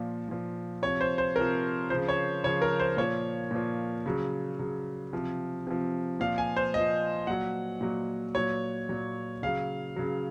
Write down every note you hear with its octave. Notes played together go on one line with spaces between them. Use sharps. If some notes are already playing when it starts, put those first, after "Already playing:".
Already playing: A#2 F3
A#2 F3
C3 F3 C#5
C5
C5
C3 F3 A#4
C#3 F3 C5
C#5
C#3 F3 C#5
A#4
C5
A#2 F3 C#5
A#2 F3
C#3 F#3
C#3 F#3
C3 F3
C3 F3
A#2 F3 F5
G#5
C5
A#2 F3 D#5
A#2 F#3 F#5
A#2 F#3
A#2 F#3 C#5
A#2 F#3
C#3 F#3 F5
C#3 F#3